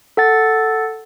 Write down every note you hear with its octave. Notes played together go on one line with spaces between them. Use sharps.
A4 F#5 A6